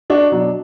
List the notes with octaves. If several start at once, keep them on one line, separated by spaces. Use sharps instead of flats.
D4 F#4
B2 F#3 D4